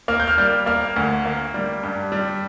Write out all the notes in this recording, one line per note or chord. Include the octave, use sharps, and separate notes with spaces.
A#3 F6
G6
F6
G3
A#3 F6
D2
A#3
G3
G2
G3